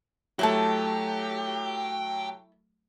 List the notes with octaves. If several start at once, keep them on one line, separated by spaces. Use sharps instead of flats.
F#3 A3 E4 G4 G5 A5